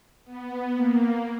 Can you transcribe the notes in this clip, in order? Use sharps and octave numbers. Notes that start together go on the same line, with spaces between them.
B3
A#3